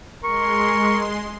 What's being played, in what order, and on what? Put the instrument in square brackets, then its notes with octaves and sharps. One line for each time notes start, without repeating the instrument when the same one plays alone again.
[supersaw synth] G#3 C6 [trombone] A#4 [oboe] C#6